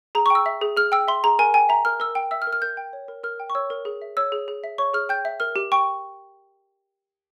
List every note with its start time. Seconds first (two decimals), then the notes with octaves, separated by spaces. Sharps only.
0.15 G#4 A#5
0.26 C#6
0.30 G5 E6
0.46 E5
0.61 G#4
0.76 G#4 F6
0.92 G5 E6
1.08 E5 C6
1.24 G#4 A#5
1.39 A#4 G#5
1.54 G5 G#5
1.69 E5 A#5
1.85 A#4 F6
2.00 A#4 E6
2.15 G5
2.31 E5 E6
2.42 F6
2.47 A#4
2.53 F6
2.62 A#4 G6
2.77 G5
2.93 C#5
3.08 A#4
3.23 A#4 F6
3.40 G5
3.50 C#6
3.55 C#5 E6
3.70 A#4
3.85 G#4
4.02 E5
4.17 C#5 E6
4.32 G#4
4.48 G#4
4.64 E5
4.78 C#5 C#6
4.94 G#4 F6
5.09 G5 G6
5.25 E5
5.40 A#4 F6
5.56 G4
5.72 G5 C#6